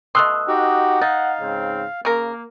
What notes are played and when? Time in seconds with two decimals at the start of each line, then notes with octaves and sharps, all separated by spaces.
0.15 B2 A3 C6 D#6 E6 F#6
0.48 D#4 F#4 G4 F#5
1.01 D#4 F5 A6
1.39 G#2 C#3 C4
2.05 C#3 A#3 A#4